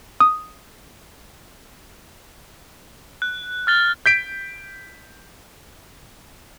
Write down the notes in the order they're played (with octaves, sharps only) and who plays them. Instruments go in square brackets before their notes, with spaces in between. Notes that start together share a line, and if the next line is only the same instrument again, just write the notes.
[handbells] D#6
[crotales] F#6
F6 A6 G7
[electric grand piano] G6 B6 D7